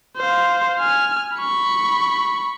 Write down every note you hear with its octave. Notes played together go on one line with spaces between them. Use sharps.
C5 F5
G#5 F6
B5 C#6